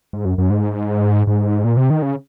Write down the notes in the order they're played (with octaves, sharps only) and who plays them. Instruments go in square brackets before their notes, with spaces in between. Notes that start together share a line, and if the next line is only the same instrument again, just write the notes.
[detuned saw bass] G#2
F#2
F#2
G#2
G#2
A#2
C3
D#3
C#3